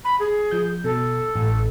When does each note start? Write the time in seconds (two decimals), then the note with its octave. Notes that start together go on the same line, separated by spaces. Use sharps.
0.04 B5
0.19 G#4
0.51 F3 G6
0.84 B2 A4
1.36 A1